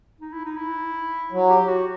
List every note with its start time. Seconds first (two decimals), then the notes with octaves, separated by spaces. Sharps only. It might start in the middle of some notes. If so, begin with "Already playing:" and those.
0.21 D#4
0.33 E4
0.45 D#4
0.57 E4
1.32 F#3
1.50 G4
1.69 F#4